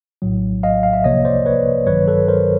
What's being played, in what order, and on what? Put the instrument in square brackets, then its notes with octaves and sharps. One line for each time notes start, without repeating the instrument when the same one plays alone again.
[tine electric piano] A#1 A2 F#3
D#5 F5
F5
E5
C2 C3 F3 A#3 C#5 D#5
C5 D5
B4 C#5
A1 G2 D#3 F#3 B4 C#5
A4 B4
A#4 C5